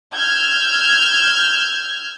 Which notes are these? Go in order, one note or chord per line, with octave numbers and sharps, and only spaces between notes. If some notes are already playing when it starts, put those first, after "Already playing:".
E6 F6 G6 G#6